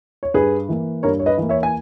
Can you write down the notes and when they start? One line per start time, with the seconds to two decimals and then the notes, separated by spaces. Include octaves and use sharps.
0.23 C#5
0.34 G2 G#4 B4
0.69 E3 A#3
1.03 G2 A#4 C#5
1.19 C#5
1.26 B4 D#5
1.38 E3 A#3
1.49 C#5 E5
1.63 G#5